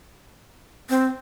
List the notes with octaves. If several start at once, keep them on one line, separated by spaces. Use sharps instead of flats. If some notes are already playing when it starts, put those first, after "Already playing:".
C4